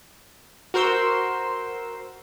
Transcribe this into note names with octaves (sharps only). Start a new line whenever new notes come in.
F#4 A#4 C5 C6 E6